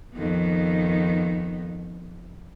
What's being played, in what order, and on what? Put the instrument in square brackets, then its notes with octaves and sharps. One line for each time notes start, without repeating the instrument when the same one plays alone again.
[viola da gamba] F2 D#3 B3